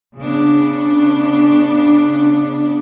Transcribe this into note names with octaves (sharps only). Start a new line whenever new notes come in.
C#3 B3 D4